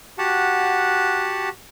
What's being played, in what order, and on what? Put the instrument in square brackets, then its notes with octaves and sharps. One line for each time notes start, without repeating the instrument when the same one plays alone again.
[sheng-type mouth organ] F#4 G4 F#5 A5